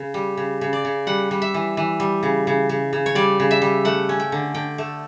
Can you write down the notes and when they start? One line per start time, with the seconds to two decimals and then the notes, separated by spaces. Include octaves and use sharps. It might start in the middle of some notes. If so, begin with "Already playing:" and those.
Already playing: C#3
0.14 G3
0.37 C#3
0.61 C#3
0.73 D5
0.85 C#3
1.07 G3 F#5
1.31 G3
1.42 E5
1.54 E3
1.77 E3
2.00 G3
2.23 C#3
2.47 C#3
2.69 C#3
2.93 C#3
3.06 C#5
3.15 G3 D5
3.40 C#3
3.51 E5
3.62 G3
3.85 A3 F#5
4.09 C#4
4.20 G5
4.32 D3
4.54 D3 G5
4.78 A3